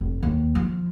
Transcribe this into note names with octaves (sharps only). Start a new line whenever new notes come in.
F1
D#2
F3